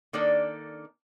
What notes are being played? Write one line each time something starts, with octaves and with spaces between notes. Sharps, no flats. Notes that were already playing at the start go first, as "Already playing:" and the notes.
D#3 A#3 D4 A4 D5